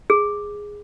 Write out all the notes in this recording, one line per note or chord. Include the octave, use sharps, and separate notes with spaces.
G#4